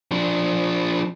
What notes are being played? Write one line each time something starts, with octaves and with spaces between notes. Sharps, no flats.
F3 D4